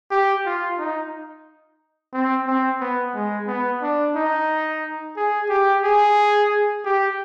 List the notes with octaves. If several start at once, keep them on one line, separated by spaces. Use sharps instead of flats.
G4
F4
D#4
C4
C4
B3
G#3
B3
D4
D#4
G#4
G4
G#4
G4